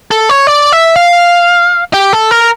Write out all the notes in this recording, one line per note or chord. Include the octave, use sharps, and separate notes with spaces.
A4
C#5
D5
E5
F5
G4
A4
A#4